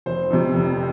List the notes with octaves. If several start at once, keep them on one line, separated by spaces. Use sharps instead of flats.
F1 C5
F2 C3
F1